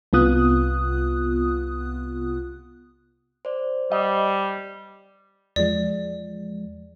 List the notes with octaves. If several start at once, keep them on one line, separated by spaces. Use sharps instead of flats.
C2 C3 B3 F4 D#6 F#6
C5 D5
G3 D#5
E2 F3 G#3 D5